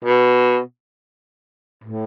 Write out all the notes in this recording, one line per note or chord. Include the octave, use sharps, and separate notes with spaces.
B2
A2